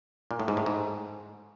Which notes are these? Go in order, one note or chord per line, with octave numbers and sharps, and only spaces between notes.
A#2
A2
G#2
A2
G#2